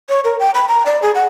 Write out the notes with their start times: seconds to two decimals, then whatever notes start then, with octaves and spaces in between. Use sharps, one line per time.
0.09 C#5
0.24 A#4
0.39 G5
0.54 B5
0.68 A#5
0.86 D5
1.02 G#4
1.15 F#5